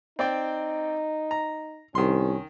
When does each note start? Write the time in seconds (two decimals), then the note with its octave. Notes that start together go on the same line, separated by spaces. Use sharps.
0.19 C4 D#4 D5 G5
1.31 A#5
1.95 C2 D#3 C#4 C6